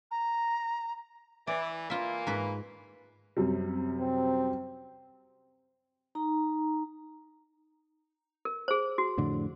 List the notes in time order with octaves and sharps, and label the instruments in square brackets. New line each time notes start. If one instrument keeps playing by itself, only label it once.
[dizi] A#5
[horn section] E3 [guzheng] D5
[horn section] E3 A#3 [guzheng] F4 E5
[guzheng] G#2 B4
[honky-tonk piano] F#2 C3 G3
[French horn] C4
[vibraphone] D#4 A#5
[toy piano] A#4
G#4 C5
F#4
[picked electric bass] F2 A2 D3